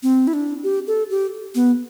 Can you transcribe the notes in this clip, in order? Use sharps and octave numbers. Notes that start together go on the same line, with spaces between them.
C4
E4
D4
G4
A4
G4
B3